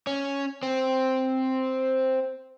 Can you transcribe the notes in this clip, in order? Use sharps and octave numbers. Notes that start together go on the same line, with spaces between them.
C#4
C4